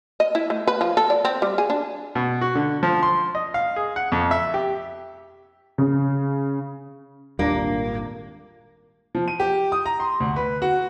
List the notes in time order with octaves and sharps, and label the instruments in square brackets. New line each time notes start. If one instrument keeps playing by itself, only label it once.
[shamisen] D#5
E4
A3
B4
F3
A4
D5
C4
G3
G#4
D4
[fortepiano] B2
F#4
D3
F3
C6
D#5
F5
G#4
F#5
F2
E5
G4
[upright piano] C#3
[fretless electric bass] G#1 A#2 G3 [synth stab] D#2 D4 [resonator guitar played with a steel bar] A#3
[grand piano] F3
D#7
G4
D#6
A#5
C6
D2
B4
F#4